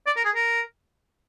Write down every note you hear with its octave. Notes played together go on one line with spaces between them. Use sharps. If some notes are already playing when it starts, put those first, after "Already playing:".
D5
A#4
G#4
A#4